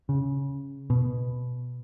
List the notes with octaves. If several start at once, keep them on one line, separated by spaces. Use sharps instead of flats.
C#3
B2